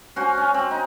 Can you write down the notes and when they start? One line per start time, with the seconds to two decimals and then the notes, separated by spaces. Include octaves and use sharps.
0.16 C#4 F#4 C5
0.37 C#4
0.54 C4
0.71 D#4